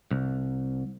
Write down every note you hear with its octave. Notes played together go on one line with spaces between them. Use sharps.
C2